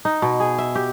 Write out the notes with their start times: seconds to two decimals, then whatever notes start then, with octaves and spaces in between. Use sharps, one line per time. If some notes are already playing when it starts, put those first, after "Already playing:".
0.05 D#4
0.22 B2
0.40 G#4
0.58 E5
0.75 G4